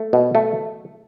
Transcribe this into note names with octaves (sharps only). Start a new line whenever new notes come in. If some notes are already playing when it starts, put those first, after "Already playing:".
Already playing: A3
B2
A3